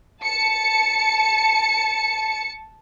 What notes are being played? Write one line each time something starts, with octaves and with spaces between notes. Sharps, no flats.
A5 C#7